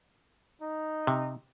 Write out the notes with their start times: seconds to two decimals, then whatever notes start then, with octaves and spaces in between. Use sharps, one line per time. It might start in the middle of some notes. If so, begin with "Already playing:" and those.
0.62 D#4
1.07 C3